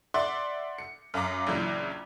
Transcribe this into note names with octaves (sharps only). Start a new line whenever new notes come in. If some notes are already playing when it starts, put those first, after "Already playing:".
D5 E5 F#5 C6
C#7
F#2 F5 A#5 D6
A#1 C#3 E3 F#3